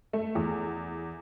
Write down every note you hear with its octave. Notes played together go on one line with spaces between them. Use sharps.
A3
E2